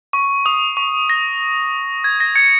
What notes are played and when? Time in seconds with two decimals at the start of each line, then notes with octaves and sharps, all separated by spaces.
0.13 C#6
0.46 D#6
0.77 C#6
1.09 A#6
2.04 G#6
2.20 A#6
2.36 G#6 C#7